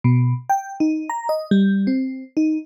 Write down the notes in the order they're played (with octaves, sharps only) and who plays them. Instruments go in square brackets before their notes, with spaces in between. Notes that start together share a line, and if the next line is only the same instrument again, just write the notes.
[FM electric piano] B2
G5
D#4
A#5
D#5
G3
C4
D#4